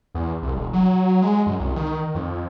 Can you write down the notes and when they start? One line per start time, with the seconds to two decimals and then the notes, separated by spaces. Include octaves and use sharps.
0.15 E2
0.43 C2
0.56 E1
0.73 F#3
1.22 G#3
1.46 F#2
1.59 C2
1.76 D#3
2.15 F2